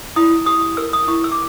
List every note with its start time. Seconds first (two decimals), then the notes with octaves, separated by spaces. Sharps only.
0.16 E4 D#6
0.46 G4 D#6
0.77 A#4 E6
0.93 D#6
1.08 E4 C#6
1.24 E6
1.32 D6